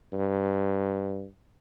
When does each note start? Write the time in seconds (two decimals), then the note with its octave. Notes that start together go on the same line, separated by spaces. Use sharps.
0.13 G2